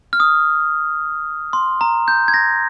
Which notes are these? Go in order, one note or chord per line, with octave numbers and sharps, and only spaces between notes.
F6
D#6
C6
A#5
G6
G#6
A#6